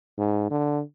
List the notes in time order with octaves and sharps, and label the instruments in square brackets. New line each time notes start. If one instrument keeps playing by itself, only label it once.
[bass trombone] G#2
D3